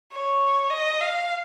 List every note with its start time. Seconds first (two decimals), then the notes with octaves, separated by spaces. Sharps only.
0.12 C#5
0.70 D#5
1.00 F5